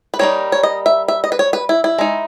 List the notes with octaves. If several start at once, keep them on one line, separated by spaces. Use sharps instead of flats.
B4
G3 A#3 D#4 C#5
C#5
D#5
E5
E5
D#5
B4
C#5
B4
E4
E4
G#3 D#4